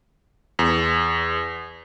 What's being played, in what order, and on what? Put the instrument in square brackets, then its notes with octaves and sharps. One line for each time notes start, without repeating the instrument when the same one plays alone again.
[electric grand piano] E2